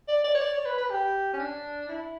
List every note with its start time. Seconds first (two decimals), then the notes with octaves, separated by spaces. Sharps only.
0.08 D5
0.24 D5
0.35 C#5
0.41 D5
0.53 C#5
0.66 B4
0.78 B4
0.90 G4
1.34 C#4
1.39 D4
1.89 E4